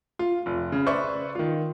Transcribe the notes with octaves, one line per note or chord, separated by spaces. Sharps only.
F4
F1
C#3
B4 C5 D5 E5 C#6
D#3 F4